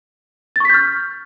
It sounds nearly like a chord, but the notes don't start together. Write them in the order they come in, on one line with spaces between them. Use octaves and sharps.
A6 C#6 B6 G6 F6